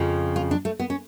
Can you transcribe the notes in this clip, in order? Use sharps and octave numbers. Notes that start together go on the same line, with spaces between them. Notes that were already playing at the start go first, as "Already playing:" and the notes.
Already playing: F2 C#3 F3
F4
D4
A3
B3
C#4